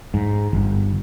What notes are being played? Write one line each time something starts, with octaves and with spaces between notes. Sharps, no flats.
G#2
G1